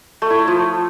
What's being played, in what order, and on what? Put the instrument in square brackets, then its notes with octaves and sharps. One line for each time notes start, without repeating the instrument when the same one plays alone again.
[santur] A3
E4
A3
F3